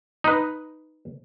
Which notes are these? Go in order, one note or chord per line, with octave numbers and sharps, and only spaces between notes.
D#4 B4